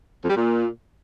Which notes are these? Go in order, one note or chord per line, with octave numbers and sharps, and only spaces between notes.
F2
G3
A#2